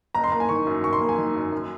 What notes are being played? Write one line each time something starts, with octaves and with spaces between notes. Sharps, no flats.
F#1 A#5
C6
A#3 A#5
G#5
D#3 C#6
F#2
F#1 C#6
C6
A#3
G#5
D#3
F#2
F#2